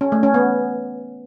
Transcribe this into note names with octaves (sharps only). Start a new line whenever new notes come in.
C#4
A3
C#4
B3